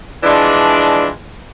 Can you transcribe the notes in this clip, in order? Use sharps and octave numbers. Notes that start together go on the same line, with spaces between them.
E3 F3 G#3 D4